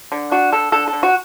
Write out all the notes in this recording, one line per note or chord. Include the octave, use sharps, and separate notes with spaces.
D3
D4 F#4
D3 A4
D3 A4
A4
D3
F#4